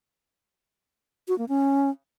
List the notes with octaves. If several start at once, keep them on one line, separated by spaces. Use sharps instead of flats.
F#4
A#3
C#4